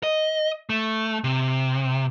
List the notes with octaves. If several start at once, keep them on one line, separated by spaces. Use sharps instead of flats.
D#5
A3
C3